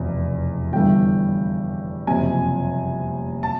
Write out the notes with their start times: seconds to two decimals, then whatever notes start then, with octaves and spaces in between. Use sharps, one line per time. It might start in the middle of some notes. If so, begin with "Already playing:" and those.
Already playing: F1 E2 B2
0.73 G1 G2 E3 A3 D4 G5
2.07 F#1 F2 C3 G#5
3.43 A5